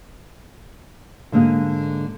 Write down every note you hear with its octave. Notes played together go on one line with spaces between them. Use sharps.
G#2 D3 A#3 D#5